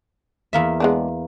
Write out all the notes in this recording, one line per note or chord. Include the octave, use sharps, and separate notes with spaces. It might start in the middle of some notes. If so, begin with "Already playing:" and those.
E2 A#3 E5
G#3 B3 D4